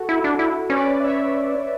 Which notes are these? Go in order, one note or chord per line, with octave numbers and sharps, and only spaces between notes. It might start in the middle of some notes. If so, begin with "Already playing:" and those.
Already playing: F#4 A4
E4
D4
E4
C#4 B4 D5
C#5 E5